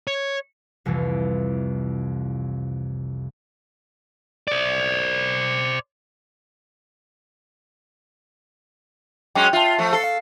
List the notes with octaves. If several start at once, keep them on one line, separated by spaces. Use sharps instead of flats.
C#5
C2 F2 C3 E3
C5 D5
F#3 G#3 C#4 G5
F4 E5 A5
F3 A3
A4 F5 C7
F5